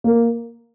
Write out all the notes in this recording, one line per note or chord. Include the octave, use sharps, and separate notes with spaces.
A#3